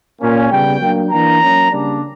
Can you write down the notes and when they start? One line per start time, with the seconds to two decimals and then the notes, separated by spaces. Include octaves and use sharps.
0.21 A#2 A#3 C#4
0.51 C#3 G3 B3 G5
0.80 F#3 A#3 D4
1.11 E3 A#3 D4 A#5
1.41 F#3 A#3 C#4
1.71 C#3 G3 A#3 D4